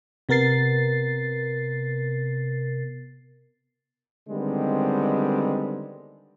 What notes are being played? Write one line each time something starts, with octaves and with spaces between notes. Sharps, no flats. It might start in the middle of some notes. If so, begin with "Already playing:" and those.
C3 B3 A#4 A6 C7
D3 D#3 G3 G#3 B3 C4